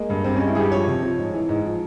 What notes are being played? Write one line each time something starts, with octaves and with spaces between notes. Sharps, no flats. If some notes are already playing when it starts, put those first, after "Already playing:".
Already playing: G#3 A#3
G2
G2 C4
G#3 C#4
E4
G2 G4 G#4
F3 C#5
C3
F3
G#2
E3
G#2
F3